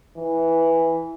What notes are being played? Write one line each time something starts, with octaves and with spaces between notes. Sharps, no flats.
E3